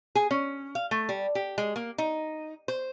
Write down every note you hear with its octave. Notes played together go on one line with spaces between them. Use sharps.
G#4
C#4
F5
A3
G3
G4
G#3
A#3
D#4
C5